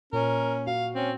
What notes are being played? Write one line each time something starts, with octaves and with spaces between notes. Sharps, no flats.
A#2 C#4 A#4
F#4 F5
C4 C#4